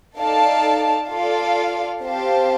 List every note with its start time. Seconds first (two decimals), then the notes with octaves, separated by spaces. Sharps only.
0.18 D#4 A4 D5 F5 A5
1.09 F4 A4 D5 F5
2.02 C4 G4 C5 F5 A5